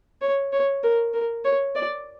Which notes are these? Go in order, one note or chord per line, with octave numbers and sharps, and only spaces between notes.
C#5
C#5
A#4
A#4
C#5
D5